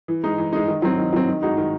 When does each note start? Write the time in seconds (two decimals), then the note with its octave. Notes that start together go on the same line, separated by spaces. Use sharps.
0.08 E3
0.23 G#3 D#4
0.38 E3
0.53 G#3 D#4
0.68 D#3
0.82 F#3 C4
0.97 D#3
1.13 F#3 C4
1.27 D#3
1.42 G#3 D#4 F#4
1.57 D#3